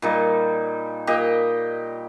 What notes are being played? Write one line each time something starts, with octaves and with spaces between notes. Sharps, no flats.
A#2 G3 D#4
A#2 G4 D#5